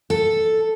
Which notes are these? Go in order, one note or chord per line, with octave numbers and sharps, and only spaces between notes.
A4